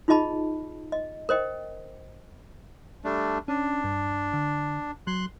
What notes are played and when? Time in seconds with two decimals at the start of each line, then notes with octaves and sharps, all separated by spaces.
0.08 D#4 F4 G#4 D#5 A5 B5
0.92 D#5
1.29 A#4 C5 D#5 G5
3.04 G3 A3 D4
3.48 C#4 D4
3.84 G2
4.33 D3
5.07 F#3 C6 F#6